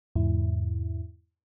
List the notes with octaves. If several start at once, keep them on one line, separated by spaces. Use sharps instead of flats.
E2 G#2 C3 E4